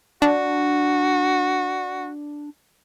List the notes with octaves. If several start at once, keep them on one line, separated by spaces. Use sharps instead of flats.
D4 F#4